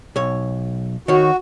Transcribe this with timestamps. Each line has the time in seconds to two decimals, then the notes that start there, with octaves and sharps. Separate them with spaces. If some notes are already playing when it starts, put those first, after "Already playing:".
0.16 B1 C#5
1.08 D#3 F#4 C#5